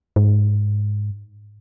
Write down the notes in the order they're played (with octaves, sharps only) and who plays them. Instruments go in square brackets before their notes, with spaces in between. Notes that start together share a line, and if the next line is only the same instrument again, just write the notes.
[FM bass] G#2